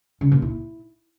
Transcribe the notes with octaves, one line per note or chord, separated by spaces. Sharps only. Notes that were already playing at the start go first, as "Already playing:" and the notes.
C#3
A#2
E4